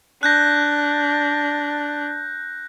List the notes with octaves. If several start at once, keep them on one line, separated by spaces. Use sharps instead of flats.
D4 F#6 G6 A#6